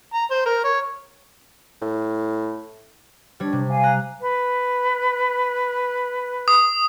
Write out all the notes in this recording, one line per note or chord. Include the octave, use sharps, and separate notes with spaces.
A#5
C5
A#4
C#5
A2
G3 D4 C#5
C3
F5 G#5
A#5 F#6
B4
D#6